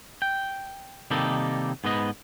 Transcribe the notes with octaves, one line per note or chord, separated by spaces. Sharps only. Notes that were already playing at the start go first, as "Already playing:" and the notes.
G5
C3 D#3 G3 A#3 D#4 A4
G#2 B3 B4 D#5